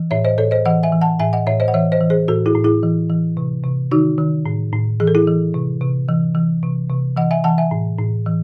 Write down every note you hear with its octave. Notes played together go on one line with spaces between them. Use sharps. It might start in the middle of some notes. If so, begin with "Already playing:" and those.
Already playing: E3
A2 C#5 E5
C5 D#5
A2 A4 C#5
C5 D#5
E3 D#5 F#5
E5 G#5
E3
F#5 A5
A2 E5 G#5
D#5 F#5
A2 C#5 E5
C5 D#5
F#5
E3 C#5 E5
C5 D#5
E3
G#4 C5
A2 F#4 A4
E4 G#4
A2
E4 G#4
E3
E3
C3
C3
D#3 D#4 F#4
D#3
A2
A2
E3 G#4
A4
E4 G#4
E3
C3
C3
E3
E3
C3
C3
E3 D#5 F#5
E5 G#5
E3 F#5 A5
E5 G#5
A2
A2
E3